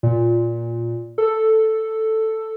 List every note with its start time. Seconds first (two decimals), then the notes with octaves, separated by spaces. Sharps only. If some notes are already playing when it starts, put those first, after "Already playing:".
0.03 A#2
1.18 A4